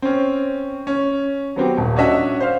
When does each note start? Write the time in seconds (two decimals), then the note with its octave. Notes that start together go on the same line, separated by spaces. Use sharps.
0.02 C4 C#4
0.87 C#4
1.56 F#3 B3 C4 G4
1.77 D#1
1.96 C#4 D4 F#4 D#5 E5 F#5
2.40 C5 F5